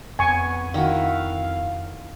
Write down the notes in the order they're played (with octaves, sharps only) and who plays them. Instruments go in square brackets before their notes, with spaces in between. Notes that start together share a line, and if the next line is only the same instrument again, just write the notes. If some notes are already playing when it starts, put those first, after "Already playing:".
[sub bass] F2 [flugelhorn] B3 [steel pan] G#5 C#6
[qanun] D#3 E4 F#4 [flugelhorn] F5